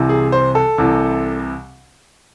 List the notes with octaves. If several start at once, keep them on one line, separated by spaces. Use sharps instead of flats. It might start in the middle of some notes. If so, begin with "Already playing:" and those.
Already playing: C2 C3 E3
G#4
C5
A4
C2 C3 E3